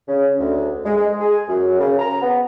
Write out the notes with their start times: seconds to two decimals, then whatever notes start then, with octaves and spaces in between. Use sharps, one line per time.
0.08 C#3
0.39 D2
0.85 G#3
0.97 G#3
1.20 G#4
1.48 F#2
1.80 C#3
1.99 A#5
2.22 B3